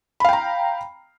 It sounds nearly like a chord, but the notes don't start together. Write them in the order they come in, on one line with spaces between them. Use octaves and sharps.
B5 F5 G5 A#5